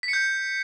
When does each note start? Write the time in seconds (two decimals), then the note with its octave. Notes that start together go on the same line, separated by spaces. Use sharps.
0.03 B6
0.08 C#7
0.13 G6